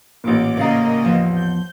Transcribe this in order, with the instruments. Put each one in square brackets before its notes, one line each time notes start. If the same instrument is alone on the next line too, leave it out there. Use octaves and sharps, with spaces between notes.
[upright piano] A1 A#2 [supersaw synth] D6
[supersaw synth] C#3 A#3 D#5 [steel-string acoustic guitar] D5 F5 A#5
[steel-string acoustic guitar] E2 F3
[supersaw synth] G6